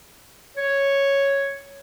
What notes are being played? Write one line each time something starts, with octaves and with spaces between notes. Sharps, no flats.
C#5